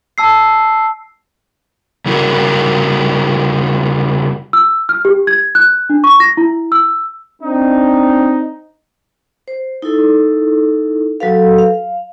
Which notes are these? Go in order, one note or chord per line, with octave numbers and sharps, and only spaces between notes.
A5 E6 C7
C#3 G3 E4 F#4 A#4
E6
F6
G4
G#6
F#6
D4
C#6
A#6
E4
E6
C4 D4 D#4
C5
D#4 E4 A4
F#3 F#4 A4 B4 F5
F5